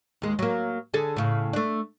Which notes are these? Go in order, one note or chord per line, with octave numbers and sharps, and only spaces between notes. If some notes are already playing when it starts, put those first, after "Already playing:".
D#2 G#3
F#3 A#3
D3 G#4 A4
A2 C#3
A3 D4